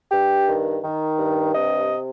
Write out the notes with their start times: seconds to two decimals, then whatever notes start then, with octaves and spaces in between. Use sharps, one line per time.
0.11 G2 G4
0.47 D#3
0.83 D#3
1.18 G2
1.54 C3 D#5